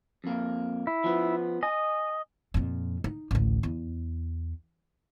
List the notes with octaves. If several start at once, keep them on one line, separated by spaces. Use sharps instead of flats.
F2 A#3
E4
F3 B3
D#5 G#5
F2 A#2
D#4
A1 D2
E2